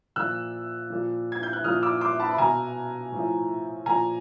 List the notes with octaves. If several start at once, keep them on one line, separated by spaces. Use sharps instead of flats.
A#2 F3 E6 F#6
A#2 F3
G#6
G6
F#6
A#2 F3 D#6 F6
D6 E6
C6 D6
A5 B5
B5
B2 G#5 A#5
A2 F3
A#2 F3 G#5 A#5